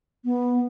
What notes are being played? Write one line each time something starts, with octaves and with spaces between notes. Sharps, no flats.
B3